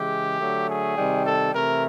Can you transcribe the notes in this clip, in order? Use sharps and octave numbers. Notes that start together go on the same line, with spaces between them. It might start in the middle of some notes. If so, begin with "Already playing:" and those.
Already playing: C#3 E3 G#3 G4
D3 F#3 A3
G#4
C3 D#3 G3
A4
C3 E3 A3 A#4